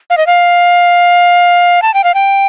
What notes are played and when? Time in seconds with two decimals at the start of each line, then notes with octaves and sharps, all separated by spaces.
0.10 F5
0.17 D#5
0.27 F5
1.82 A5
1.94 G5
2.04 F5
2.14 G5